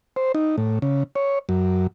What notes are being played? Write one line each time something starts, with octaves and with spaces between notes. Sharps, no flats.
C5
D#4
A2
C#3
C#5
F#2